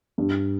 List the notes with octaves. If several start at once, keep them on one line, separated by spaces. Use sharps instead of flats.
G2